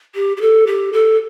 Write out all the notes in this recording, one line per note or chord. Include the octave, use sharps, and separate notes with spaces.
G4
G4
A4
G4
A4